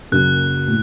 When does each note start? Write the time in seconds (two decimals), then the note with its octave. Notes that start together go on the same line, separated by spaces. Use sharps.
0.12 F#2 C#3 F#3 A#3 F#6
0.67 A2